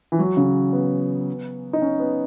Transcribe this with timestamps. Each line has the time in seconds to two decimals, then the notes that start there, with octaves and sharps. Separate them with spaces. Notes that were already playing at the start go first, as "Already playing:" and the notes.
0.12 E3
0.19 F#3
0.37 C#3
0.73 B3
1.73 D#4
1.82 C#4
1.99 B3